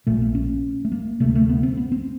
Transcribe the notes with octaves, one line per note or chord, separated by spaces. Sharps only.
A#1 A#2 A3
A#3
C#4
A3
A#3
D2 C3 A3
A3
B3
C4
B3
C4